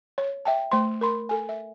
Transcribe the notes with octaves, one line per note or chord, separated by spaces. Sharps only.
C#5
E5 G5 A5
A3 C5 C6
A#4 B5 C6
A4 G#5
E5